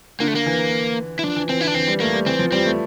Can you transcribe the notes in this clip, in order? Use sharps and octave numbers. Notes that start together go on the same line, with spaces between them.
D3 A#3
A3
A#3
E3
E4
F3 D4
E3
E3 C4
D3 E4
D4
E3 C4
G3
A3 A#3
G3
E3 C4
F3
G3 C4
A3